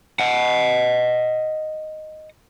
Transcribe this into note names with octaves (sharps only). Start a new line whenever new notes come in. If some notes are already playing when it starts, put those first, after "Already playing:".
D#5 F#5